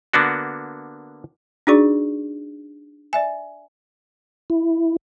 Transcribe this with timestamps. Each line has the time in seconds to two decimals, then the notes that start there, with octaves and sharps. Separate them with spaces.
0.13 D3 A#3 B3 D4 F#4
1.67 D4 D#4 F#4 G#4 D5 C#6
3.13 D5 E5 G#5
4.50 E4